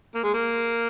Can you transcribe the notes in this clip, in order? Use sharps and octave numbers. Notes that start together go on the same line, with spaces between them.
A#3
G#3
A#3